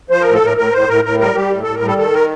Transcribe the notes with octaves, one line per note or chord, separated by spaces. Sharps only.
F3 C5
A2 A#4
A4
A2 A#4
A2 A#4
A2 C5
A2 A#4
A2 A#4
G3 A#4
G3 G4
A2
A2 A4
A#4
G3 A4
D#3 A4
A#4